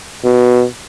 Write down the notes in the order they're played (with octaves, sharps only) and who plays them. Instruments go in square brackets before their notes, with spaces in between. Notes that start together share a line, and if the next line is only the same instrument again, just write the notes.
[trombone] B2